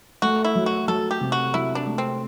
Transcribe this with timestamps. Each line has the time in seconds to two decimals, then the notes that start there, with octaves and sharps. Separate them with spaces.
0.22 A3 F#4
0.44 E4
0.55 F#3
0.66 F#4
0.88 F#3 A4
1.11 G4
1.21 C3
1.32 F#4
1.54 F#3 E4
1.75 D4
1.87 A3
1.98 C4